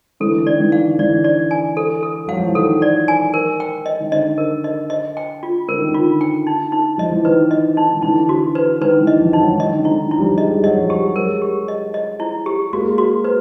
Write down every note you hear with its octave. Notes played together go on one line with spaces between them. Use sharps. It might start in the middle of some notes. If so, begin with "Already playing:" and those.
D3 E3 A4
D3
D#3 D5
D3 E3
F5
D3 E3 D5
D5
G#5
A4
A4
F#3 F5
F3
E3
D#3 A4
D5
G#5
A#4
G5
D#5
D#3
D3 D#5
A#4
D#5
D#5
G5
F4
D3 A#4
D#3
D3
F4
G5
D#4
D#4
F3 D#5
E3
D#3 B4
D#5
D#4
D#3
D3 E3 D#4
F#4
B4
D#3 B4
D3 E3
D#5
D#3 F3
D#4
E3 F#3
E3
D#3 D#5
D3
E4
D3
D#3
E4
F3 G3
G#3 D#5
G3
F#3 D#5
F3 G3
G4
F#3 G#3 A#4
G4
D#5
D#5
E4
G4
G#3 A#3 F#4
F#4
B4